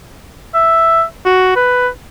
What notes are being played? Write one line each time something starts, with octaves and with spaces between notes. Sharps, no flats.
E5
F#4
B4